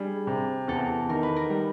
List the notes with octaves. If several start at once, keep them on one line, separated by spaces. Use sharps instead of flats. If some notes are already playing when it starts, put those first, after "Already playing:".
Already playing: G3 D4 G#4
C3
E2 A4
D#3 A#4
B4
A#4
G3